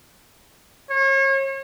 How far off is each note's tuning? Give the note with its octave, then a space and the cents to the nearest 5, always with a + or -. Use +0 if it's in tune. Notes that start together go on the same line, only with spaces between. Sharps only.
C#5 -35